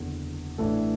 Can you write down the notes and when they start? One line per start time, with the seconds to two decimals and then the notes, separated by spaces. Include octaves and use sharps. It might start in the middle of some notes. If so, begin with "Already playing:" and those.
Already playing: F#1 E2 D3
0.58 A1 A2 E3 A3 D4 A4